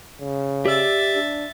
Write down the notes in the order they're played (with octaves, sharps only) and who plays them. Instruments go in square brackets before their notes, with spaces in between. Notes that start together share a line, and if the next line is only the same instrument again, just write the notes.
[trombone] C#3
[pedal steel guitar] G4 D5 E6 [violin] E5 A6
[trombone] D4